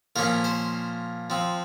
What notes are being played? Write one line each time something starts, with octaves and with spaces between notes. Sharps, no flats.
A#2 F3 A#3 C#4 A#4
C5
F3 C4